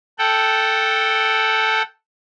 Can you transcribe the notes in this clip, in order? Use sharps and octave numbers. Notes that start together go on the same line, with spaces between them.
A4 F#5 G5